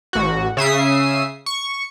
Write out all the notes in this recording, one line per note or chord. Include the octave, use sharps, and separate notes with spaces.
A1 F#4
C#3 E5 D#6 C7
C#6